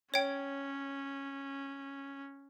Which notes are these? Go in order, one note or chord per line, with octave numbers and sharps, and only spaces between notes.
C#4 C#5 G5